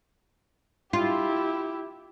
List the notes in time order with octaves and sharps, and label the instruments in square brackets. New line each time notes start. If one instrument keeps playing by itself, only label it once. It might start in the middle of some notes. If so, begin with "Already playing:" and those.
[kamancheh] E4 G4 [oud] F4